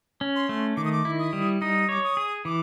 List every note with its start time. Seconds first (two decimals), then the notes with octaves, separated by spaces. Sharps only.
0.21 C#4
0.36 C6
0.49 A3
0.77 D#3 D6
0.85 D#6
0.92 D6
1.05 E4
1.19 D#6
1.33 G3
1.61 D#4 D#6
1.89 C#5 D6
2.04 D#6
2.17 G#4
2.45 E3 D6